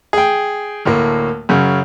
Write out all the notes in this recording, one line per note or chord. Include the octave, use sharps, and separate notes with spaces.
G#4 G5
D2 A2 A#3
F#2 C#3